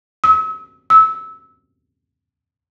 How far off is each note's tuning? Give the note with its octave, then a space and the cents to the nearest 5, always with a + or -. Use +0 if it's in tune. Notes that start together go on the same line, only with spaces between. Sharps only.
E6 -40
E6 -20